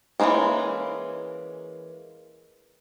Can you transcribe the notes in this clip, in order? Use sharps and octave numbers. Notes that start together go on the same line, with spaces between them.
E3 F3 G#3 A#3 C#4